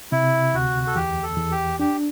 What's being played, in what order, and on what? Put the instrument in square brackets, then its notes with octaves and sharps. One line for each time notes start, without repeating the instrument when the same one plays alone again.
[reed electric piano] C3 [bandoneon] E4
[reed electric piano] D2 [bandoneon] F#4
[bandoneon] A4
[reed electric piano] E2 [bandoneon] G4
[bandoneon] A4
[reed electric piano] E2
[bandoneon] G4
[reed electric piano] D4 [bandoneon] G4